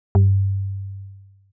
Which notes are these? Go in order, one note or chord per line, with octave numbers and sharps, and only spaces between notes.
G2